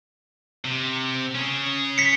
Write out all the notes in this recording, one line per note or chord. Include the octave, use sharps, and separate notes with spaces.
C3
C#4 G#4
B6 C#7